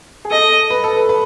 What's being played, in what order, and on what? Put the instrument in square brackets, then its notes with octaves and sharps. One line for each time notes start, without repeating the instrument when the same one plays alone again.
[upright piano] G#4
[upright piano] A4 [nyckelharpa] D#5
[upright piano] B4
A4
B4
B4